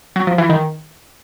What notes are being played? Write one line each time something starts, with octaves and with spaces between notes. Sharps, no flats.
F#3
F3
E3
D#3